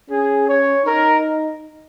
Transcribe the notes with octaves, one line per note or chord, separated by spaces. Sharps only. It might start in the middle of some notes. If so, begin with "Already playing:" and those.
C#4 G#4
C#5
D#4 A#4